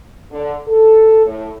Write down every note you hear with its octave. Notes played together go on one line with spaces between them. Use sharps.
D3
A4
A2